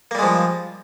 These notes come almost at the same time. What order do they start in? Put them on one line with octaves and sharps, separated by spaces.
A#3 G3 G#3 F3